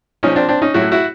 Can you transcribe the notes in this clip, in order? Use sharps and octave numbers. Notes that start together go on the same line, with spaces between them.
A#2 F3 C#4 D#4
C4 D4
C4 D4
C#4 D#4
A2 F#3 E4 F#4
E4 F#4